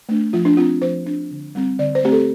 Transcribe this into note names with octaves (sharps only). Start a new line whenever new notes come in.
A3 D4
F3 F4
D4
C4 F4
F3 C5
D4
D3
G3 C4
D3 D5
C5
A3 C4 G4
A4